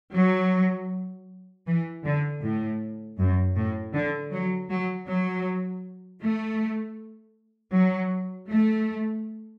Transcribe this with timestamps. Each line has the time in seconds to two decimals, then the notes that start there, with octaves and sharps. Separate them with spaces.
0.15 F#3
1.67 E3
2.05 D3
2.42 A2
3.18 F#2
3.56 A2
3.93 D3
4.32 F#3
4.70 F#3
5.08 F#3
6.22 A3
7.73 F#3
8.49 A3